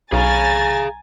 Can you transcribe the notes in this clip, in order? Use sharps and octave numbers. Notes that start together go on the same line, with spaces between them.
B1 G#4 F5 G#5 A#5 A6